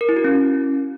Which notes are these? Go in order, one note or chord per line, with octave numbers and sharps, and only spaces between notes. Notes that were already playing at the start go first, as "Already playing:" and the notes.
A#4
E4
F#4
C#4